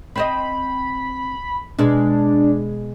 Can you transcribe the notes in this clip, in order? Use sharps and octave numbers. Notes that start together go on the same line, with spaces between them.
C4 C5 D#5 B5
B2 G#3 D4